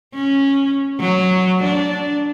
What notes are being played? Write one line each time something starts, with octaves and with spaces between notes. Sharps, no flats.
C#4
F#3
D4